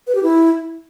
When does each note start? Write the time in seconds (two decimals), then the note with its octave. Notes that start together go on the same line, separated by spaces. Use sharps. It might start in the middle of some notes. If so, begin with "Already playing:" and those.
0.07 B4
0.15 G4
0.23 E4